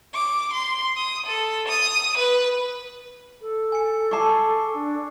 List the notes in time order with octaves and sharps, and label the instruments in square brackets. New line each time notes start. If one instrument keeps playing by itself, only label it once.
[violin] D6
C6
D#6
A4
D#6
B4
[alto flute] A4
[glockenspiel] G#5 C#7
[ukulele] G#4 A5 [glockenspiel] C#6 D6 C7
[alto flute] D4